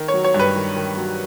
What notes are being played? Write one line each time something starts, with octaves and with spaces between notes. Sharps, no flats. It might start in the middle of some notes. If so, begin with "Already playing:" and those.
Already playing: D#3
C#5
F#3
C#5
G2
B4
D#3
D#3
F#3